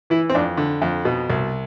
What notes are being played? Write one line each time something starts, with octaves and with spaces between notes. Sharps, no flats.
E3 E4
C4
F2 D4
D3
F2
B2
C2